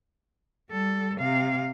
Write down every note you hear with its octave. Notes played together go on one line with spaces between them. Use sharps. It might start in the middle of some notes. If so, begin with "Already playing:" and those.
G3 A4
C3 F5